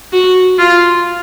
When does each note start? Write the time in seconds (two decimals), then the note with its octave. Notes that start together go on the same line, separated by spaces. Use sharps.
0.13 F#4
0.58 F4